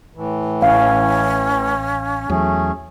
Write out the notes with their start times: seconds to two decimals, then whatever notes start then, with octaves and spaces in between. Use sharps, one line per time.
0.15 A2 E3
0.62 A1 C#4 F5
2.30 E2 F#3 A3 C#4 G#4